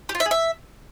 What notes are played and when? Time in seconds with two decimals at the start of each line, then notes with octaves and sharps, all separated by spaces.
0.09 G4
0.15 F4
0.20 E5
0.26 G#4
0.31 E5